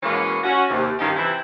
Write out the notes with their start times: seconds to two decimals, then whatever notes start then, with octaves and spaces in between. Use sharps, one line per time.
0.03 B2 E3 G#3 A#3 C#4
0.44 C#4 F#4
0.70 D#2 C3
0.99 G2 D#3 C#4 D#4 F4 G4
1.16 C3 E3 C4 E4